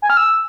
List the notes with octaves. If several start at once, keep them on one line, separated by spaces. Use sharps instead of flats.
G#5
F6
E6